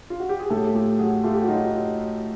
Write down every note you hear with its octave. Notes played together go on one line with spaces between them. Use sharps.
F4
F#4
G4
G#4
A2 G4 A4
A3 F4 G4
F#3 F#4 G#4
A3 F4 G4
G4
F#4
F#3 D#4 F4